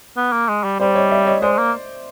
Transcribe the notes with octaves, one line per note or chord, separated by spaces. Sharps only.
B3
A#3
G#3
G3
G3 C5 D5
C#5 D#5
D5 E5
C#5 D#5
G#3 C5 D5
A#3